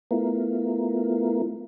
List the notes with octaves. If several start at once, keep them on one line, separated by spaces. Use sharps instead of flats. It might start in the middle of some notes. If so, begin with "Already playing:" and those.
A3 B3 E4 F4 A#4